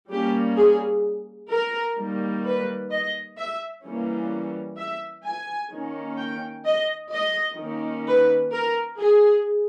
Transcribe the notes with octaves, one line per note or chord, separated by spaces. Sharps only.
G3 A#3 C#4 G4
G#4
A#4
D#3 G3 A#3
B4
D#5
E5
E3 G3 A#3 C#4
E5
G#5
D#3 A#3 C#4
G5
D#5
D#5
D#3 A#3 C#4
B4
A#4
G#4